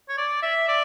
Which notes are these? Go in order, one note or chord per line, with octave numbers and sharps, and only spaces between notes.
C#5
D5
E5
D5